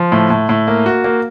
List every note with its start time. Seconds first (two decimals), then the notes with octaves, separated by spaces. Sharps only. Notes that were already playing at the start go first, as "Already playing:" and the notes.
Already playing: F3
0.12 A2
0.30 A2
0.49 A2
0.68 A#3
0.86 F#4
1.04 A#3